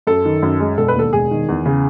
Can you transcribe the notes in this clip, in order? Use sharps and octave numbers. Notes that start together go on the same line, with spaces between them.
F#2 A4
D#3
F#2
G#3
E1 A4
B4
D#2 A4
E1 G#4
D#3
E2
C#3